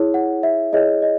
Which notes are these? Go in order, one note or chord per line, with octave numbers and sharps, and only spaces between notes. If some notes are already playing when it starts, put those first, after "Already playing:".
Already playing: E4 G#4 C#5
F#5
E5
E4 G#4 C#5 D#5
D#5